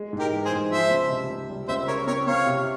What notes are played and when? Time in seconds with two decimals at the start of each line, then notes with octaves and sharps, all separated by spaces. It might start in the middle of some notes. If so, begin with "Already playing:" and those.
Already playing: G#3
0.13 G#2
0.19 G4 A#4
0.32 E3
0.45 G#4 C5
0.52 G#2
0.71 F3 C5 E5
0.91 C#2
1.10 C3
1.30 C#2
1.49 G3
1.68 C#2 C5 E5
1.88 C#3 A#4 C#5
2.07 C4 A#4 C#5
2.27 C4 C#5 F5
2.46 C3